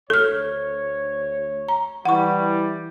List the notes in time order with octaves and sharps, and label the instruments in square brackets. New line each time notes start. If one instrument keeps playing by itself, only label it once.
[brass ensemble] D2 C#5 [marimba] A4 F6
[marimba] A#5
[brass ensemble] E3 G3 [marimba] F#5 C#6